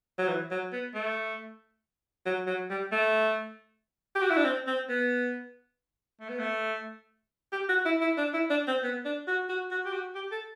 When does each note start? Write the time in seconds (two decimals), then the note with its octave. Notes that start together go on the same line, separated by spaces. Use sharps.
0.18 F#3
0.28 E3
0.51 F#3
0.72 B3
0.94 A3
2.26 F#3
2.47 F#3
2.70 G3
2.92 A3
4.15 G4
4.23 F#4
4.30 E4
4.37 D4
4.44 C4
4.67 C4
4.89 B3
6.20 A3
6.29 B3
6.39 A3
7.52 G4
7.69 F#4
7.85 E4
8.01 E4
8.17 D4
8.34 E4
8.50 D4
8.68 C4
8.83 B3
9.05 D4
9.28 F#4
9.49 F#4
9.71 F#4
9.85 G4
9.93 F#4
10.15 G4
10.32 A4